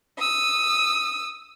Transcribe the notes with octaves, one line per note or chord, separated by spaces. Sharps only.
D#6 E6